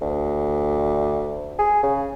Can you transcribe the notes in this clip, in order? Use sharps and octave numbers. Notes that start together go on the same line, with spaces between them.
D2
G#4
C#3